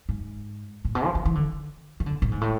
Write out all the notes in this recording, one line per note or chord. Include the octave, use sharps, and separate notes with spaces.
G#2
A2
B2
F3
E3
E3
D3
D#3
D3
A2
G#2
A2